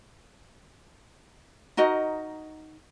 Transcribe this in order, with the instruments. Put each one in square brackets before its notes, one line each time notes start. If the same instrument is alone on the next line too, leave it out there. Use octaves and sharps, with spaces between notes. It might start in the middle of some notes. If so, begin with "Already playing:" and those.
[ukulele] D#4 F#4 A#4 D#5